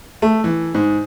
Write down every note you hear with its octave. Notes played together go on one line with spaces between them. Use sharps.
A3
E3
G#2